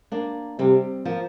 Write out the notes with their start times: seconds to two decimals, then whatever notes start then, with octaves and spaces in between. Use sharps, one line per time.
0.12 A#3 D4
0.59 C3 G3 C4
1.05 F3 A#3